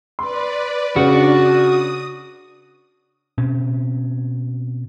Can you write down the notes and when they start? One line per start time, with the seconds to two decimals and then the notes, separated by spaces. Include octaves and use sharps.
0.19 B4 D5 C6
0.96 C#3 D4 F#4 D5
1.28 D#6
3.38 B2 C4 C#4